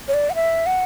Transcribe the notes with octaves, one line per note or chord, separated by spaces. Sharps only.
C#5
D5
F#5
E5
F#5